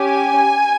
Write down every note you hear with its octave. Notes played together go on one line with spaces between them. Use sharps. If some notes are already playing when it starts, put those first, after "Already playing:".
Already playing: C#4 G4 G#5